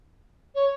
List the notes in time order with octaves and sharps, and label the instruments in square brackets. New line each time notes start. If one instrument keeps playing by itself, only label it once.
[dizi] C#5